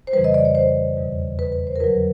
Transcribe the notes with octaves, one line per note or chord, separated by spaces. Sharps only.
C5
F2 C#3 E3 G3 B4
D#5
D5
C#5
C5
E2 B2 G3
B4
B4
C5
A#4
F2 D3 F#3 B4